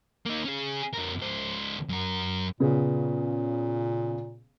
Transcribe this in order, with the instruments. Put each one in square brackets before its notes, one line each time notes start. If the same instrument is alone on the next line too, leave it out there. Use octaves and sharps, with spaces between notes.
[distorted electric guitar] A#3 D#4
C#4 G#4
F2 A#4
C#2 C5
F#2 A#4
[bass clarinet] A#2 [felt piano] C#3 B3 G#4